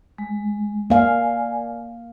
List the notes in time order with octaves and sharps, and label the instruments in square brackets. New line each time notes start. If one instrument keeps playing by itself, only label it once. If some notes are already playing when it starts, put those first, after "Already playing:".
[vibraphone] G#3
[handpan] A#3 F5 [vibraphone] D5 G#5